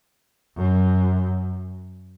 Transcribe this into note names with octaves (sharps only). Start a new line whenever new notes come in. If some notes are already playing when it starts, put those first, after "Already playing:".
F#2